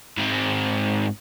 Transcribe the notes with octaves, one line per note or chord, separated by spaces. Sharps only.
G#2 C4